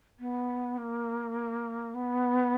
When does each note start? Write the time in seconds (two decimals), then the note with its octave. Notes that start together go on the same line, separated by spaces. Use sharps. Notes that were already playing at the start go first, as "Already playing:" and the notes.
0.20 B3
0.78 A#3
1.95 B3